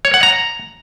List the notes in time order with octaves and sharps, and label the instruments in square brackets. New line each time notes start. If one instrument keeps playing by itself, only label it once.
[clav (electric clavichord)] C#5
F#5
A#5